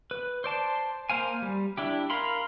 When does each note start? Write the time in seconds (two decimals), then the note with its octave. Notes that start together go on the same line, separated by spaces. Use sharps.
0.11 B4
0.44 C5 D5 A5 C6
1.10 A#3 C5 F5 G#5
1.42 G3
1.77 D4 E4 G4
2.10 A#4 F5 B5 C6